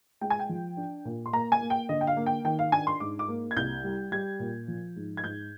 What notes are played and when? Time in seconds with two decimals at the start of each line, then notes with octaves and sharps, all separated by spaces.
0.21 G#3 G5
0.30 G#5
0.39 G5
0.49 F3
0.77 D4
1.05 A#2
1.26 C6
1.33 A#3 A#5
1.52 G#5
1.61 A#3
1.70 G5
1.89 D3 D#5
2.01 G5
2.07 F5
2.17 A#3
2.26 G5
2.44 D#3 G5
2.59 F5
2.72 D4 G#5
2.87 C6
3.00 G#2 D6
3.19 D6
3.28 A#3
3.51 G#6
3.56 C2 G6
3.84 G3
4.12 G3 G#6
4.40 A#2
4.68 F3
4.96 G#2
5.17 G#6
5.23 G#2 G6